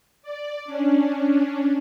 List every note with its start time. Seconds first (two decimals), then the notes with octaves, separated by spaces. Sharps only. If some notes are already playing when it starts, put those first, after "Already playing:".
0.22 D5
0.65 C#4 D4